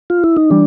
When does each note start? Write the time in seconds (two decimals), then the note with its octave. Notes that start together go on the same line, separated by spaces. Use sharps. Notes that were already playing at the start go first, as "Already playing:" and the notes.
0.10 F4
0.24 E4
0.37 D#4
0.51 E3 G3 D4